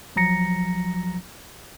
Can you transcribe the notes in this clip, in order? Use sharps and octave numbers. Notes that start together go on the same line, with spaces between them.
B1 F3 F#3 A#5 A#6 C#7